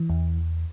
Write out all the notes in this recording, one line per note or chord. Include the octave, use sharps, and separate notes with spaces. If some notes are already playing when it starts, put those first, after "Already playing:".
Already playing: E3
E2